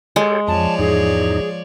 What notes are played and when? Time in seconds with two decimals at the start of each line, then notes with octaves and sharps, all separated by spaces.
0.16 G#3 G4 A4 C#5
0.48 F2 F3 C#5 D5 A5
0.79 E2 G#2 D#4 G#4